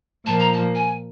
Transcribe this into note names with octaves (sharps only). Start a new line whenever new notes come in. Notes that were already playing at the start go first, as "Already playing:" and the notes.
A#2 F3 A#3 A5
A#5
A5
G#5